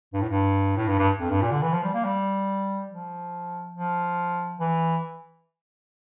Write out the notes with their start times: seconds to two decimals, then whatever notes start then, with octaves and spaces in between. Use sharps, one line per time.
0.13 G2
0.22 A2
0.29 G2
0.77 A2
0.88 G2
0.99 G2
1.20 F2
1.30 G2
1.41 A#2
1.52 D3
1.62 E3
1.73 F3
1.84 G3
1.94 A#3
2.05 G3
2.90 F3
3.74 F3
4.60 E3